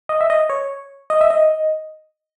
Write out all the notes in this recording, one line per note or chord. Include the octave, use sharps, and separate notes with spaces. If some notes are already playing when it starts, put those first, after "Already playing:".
D#5
E5
D#5
C#5
D#5
E5
D#5